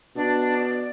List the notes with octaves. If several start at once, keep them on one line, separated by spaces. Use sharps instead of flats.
B2 D4
D5